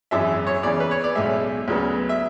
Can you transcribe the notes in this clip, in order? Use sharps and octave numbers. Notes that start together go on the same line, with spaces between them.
G#1 F#2 E3 G#3 E5
C#5
E2 C#3 E3 D5
B4
C#5
D5
B1 A2 G#3 E5
D2 C#3 F#3 B3
E5